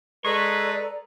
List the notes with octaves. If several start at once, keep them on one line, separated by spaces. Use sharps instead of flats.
G#3 A4 B4 D5 A#5 C#6